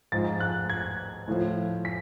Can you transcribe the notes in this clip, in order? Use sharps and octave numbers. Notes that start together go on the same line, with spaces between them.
G#2 F3 A6
F#6
G#6
A2 F3
B6